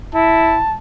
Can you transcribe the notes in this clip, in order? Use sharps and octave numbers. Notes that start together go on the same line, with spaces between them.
E4 A5